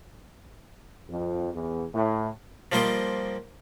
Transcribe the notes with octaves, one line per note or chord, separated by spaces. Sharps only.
F2
E2
A2
F3 G3 A#3 C5 D#5 G5